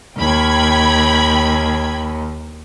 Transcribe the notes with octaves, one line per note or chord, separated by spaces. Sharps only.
D#2 G5 B5 G#6